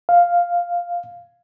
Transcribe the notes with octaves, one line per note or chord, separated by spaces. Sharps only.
F5